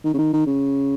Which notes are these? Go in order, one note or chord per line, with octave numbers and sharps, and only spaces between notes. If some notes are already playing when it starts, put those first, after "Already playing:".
D#3
C#3
D#3
D#3
C#3